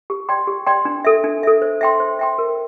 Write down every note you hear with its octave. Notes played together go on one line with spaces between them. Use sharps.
G4
D5 G5 C6
G4
D5 G5 C6
D4
A4 E5
D4
A4 E5
C5
E5 G5 C6
C5
E5 G5 C6
A#4